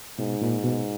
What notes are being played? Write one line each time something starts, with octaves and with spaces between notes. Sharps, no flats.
G#2 B2
A#2
B2